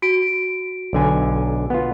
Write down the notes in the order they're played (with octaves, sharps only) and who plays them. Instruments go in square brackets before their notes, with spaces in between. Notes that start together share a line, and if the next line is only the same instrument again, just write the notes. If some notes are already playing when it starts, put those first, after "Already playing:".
[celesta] F#4 D7
[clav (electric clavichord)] B1 D3 G#5
B3 F4